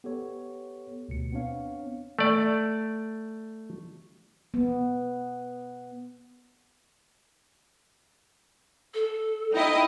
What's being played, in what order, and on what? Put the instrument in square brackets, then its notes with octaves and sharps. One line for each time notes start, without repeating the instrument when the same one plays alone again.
[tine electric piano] B3 G4 A4 C#5
D2 B2 C#7
B3 C4 D4 C#5 F5
[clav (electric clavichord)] A3 D5
[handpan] B3
[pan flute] A4
[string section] D#4 E4 D#5 [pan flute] G5